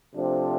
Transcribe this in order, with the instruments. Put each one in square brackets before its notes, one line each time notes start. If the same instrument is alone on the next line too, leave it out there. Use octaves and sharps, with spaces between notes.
[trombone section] C3 F3 A3 D4 G4